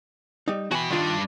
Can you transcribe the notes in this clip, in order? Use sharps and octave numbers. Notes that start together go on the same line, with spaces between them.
G3 D#4
E3 F#4 G5 G#5 B5
G2 D#3 D4 F4